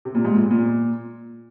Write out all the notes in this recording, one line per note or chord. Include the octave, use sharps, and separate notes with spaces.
C3
A#2
G#2
A#2
A#2